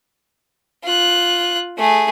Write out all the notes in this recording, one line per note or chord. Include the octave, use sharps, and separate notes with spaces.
F4 F#6
A3 G#4